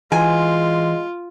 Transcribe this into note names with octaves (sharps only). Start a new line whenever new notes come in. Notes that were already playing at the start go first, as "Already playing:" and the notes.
E3 G#3 F4 G#5